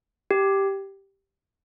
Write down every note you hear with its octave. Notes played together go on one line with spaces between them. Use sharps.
G4